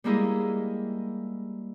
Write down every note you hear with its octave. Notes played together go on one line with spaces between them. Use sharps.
G3 G#3 A#3 E4 G#4 D#5